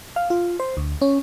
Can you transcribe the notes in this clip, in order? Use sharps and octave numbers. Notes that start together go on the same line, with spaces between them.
F5
F4
C5
D2
C#4